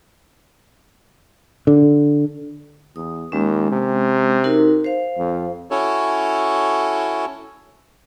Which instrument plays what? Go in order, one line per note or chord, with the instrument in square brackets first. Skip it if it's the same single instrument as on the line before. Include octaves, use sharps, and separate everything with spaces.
[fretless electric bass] D3
[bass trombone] E2 [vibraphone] D#6
[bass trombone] D#2 [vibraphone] G#3 C#4
[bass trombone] C3
[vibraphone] D#4 F#4 A#4
C5 F5
[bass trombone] F2
[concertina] C#4 E4 F#4 A4 C#5